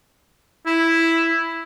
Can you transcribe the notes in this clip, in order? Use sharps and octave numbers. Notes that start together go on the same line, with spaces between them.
E4